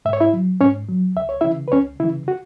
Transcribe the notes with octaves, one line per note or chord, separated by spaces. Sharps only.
G#2 E5
C#5
E4 E5
F#3
G#2 C#4 C#5
F#3
C#2 E5
C#5
C#3 E3 E4 E5
B4
C#2 C#4 C#5
C#3 E3 E4
F#4